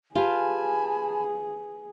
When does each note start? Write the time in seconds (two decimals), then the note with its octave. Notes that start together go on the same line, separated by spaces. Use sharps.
0.15 F4 G4 G#4 B4 G#5 A5 B5